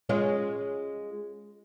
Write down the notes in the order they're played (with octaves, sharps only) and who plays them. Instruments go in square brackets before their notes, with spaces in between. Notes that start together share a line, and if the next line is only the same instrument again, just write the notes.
[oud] G#3 C#4 F4